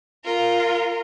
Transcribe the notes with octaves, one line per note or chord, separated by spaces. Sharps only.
F4 A#4